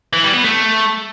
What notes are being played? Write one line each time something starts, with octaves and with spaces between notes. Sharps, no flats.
E3
G3
B3
A3